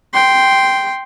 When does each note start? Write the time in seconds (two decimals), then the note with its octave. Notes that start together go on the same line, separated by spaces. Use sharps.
0.13 G5 C6